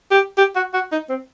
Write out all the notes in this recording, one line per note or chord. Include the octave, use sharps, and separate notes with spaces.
G4
G4
F#4
F#4
D#4
C4